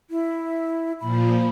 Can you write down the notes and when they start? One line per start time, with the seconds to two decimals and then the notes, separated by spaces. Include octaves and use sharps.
0.10 E4
1.00 A#2 F3 B5